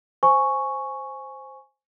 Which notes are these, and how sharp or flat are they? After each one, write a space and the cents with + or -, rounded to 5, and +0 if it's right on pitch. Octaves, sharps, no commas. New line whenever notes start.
C5 +0 G#5 +5 C#6 +0